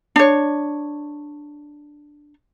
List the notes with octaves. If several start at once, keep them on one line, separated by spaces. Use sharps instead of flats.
D4 C#5